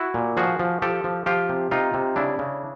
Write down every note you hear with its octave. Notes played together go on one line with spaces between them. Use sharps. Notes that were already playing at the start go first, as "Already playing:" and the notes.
Already playing: E4 F#4
A#2
F3 F#4 G#4
F3
F3 G4 A4
F3
F3 F4 G4
C3
C3 D#4 F4
C3
C#3 D4 E4
C#3